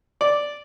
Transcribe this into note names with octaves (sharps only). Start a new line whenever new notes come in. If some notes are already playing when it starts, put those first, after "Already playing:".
D5